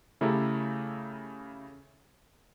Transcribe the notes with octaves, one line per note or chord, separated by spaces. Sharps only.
C#3 A3 E4 G4 A4 A#5